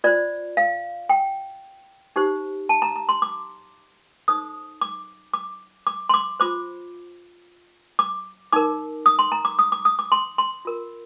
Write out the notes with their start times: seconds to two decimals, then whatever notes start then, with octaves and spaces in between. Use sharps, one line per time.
0.04 F4 C5 D5
0.57 F5
1.09 G5
2.16 D#4 G4 C5
2.69 A5
2.82 A#5
2.96 A#5
3.09 C6
3.22 D6
4.28 D#4 A4 C5 D#6
4.81 D6
5.34 D6
5.87 D6
6.09 C6
6.14 D6
6.40 F4 C5 D6
7.99 D6
8.53 D#4 A#4 D6
9.06 D#6
9.19 C6
9.32 A#5
9.45 D6
9.59 D#6
9.72 D6
9.85 D#6
9.99 D6
10.12 C6
10.38 C6
10.65 F4 A#4